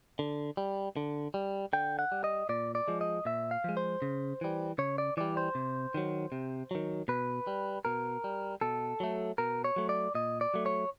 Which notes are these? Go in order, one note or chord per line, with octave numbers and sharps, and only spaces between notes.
D3
G3
D3
G3
D3 G5
F#5
G3
D#5
A#2 D5
D5
F3 G#3
D#5
A#2 E5
F5
F3 G#3
C5
C#3
E3 G3
C#3 C#5
D5
E3 G3 D5
C5
C3
D#3 F#3
C3
D#3 F#3
B2 B4
G3
B2 A#4
G3
B2 A4
F#3 A3
B2 A#4
C#5
F#3 A3
D5
A#2 D#5
D5
F#3 A3
C#5